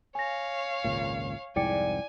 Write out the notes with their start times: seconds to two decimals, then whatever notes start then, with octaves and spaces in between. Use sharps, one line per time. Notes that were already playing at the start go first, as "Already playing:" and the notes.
0.15 C#5 F5 G#5 A#6
0.84 G#1 C#2 A#2
1.56 C2 F2 G#2 E4 D5 G5 G#5 C#7